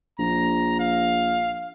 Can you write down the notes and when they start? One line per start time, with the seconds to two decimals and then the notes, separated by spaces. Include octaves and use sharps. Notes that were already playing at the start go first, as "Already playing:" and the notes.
0.19 A#1 A#5
0.79 F5